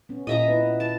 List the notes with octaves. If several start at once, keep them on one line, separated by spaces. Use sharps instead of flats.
B3 C#4
A#2 D#5 E5 A#5
B3 E4 B4
A5